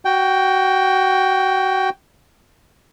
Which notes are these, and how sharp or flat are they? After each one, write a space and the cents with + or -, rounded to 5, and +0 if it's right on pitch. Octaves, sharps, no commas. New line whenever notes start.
F#4 +20 G5 +0